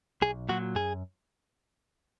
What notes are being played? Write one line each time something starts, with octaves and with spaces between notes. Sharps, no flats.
B1 G#4
A#2 F#3 F#4
F#2 G#4